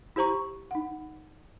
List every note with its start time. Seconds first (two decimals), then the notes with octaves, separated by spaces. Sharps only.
0.16 E4 G4 C5 A#5 C#6
0.71 D#4 F#5